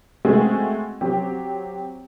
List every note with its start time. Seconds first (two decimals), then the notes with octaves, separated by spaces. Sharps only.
0.25 G#3 A3 C4 F#4 G#4
1.01 F#3 C4 G4